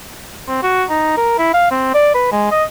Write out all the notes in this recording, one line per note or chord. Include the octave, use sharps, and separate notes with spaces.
C4
F#4
D#4
A#4
E4
F5
C4
D5
B4
G#3
D#5